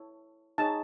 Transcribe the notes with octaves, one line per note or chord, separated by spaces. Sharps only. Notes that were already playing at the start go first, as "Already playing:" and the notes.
Already playing: E4 A4 C#5
D#4 G#4 C#5 A5